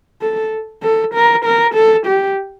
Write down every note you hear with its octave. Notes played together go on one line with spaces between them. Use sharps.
A4
A4
A#4
A#4
A4
G4